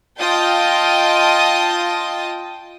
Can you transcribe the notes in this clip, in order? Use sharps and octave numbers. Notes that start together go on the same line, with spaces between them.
F4 D#5 G5 A5 D#6